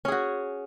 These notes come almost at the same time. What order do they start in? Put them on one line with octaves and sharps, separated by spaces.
C#4 G#4 F#4